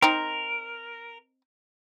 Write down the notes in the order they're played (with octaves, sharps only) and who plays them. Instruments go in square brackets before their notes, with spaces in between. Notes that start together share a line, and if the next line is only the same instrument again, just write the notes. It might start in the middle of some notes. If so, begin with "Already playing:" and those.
[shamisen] C4 D#4 [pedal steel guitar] A#4